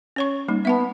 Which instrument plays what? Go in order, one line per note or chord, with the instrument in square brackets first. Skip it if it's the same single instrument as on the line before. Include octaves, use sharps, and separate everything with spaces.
[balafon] C#4 C#5 C#6
G3 A#3 D#4
[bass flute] B3 [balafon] E5 F#5 A5